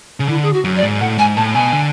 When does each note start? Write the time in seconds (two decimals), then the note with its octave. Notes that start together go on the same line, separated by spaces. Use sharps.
0.20 C#3
0.29 D3 E4
0.43 G#4
0.53 F#4
0.64 F#2
0.76 D5
0.83 G#2
1.00 A2 F#5
1.18 G#2 G#5
1.36 A2 A5
1.54 B2 G#5
1.73 D3